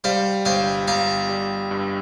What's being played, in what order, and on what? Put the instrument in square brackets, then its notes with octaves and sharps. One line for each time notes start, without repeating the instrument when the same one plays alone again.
[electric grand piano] G3 [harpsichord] C5 F5
[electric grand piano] G1 [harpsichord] C5 F5
[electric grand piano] G1 [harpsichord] F5 A#5
[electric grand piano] G3
G2